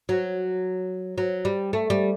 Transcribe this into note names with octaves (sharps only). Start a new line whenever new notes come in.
F#3
F#3
G3
A3
G3